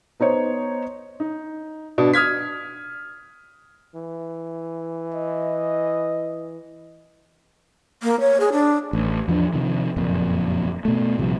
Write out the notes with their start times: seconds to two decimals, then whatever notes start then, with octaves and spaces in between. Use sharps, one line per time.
0.20 B3 D#4 C5 C#5
1.20 D#4
1.98 B2 D4
2.14 D#6 F6 G#6 B6
3.95 E3
5.14 D#5
8.03 A#3
8.20 C#5
8.40 G#4
8.52 D4
8.93 A1
9.28 E2 F3 D4
9.53 C3 D#3 F3
9.96 F#1 F2 A#2
10.85 B2 A3
11.18 A#1 C3 F3 G3